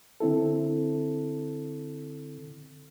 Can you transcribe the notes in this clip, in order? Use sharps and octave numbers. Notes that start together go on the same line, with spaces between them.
D3 C4 E4 A4